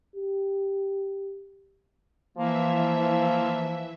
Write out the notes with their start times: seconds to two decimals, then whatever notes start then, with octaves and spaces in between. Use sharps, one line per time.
0.16 G4
2.38 E3 F3 A#3 E5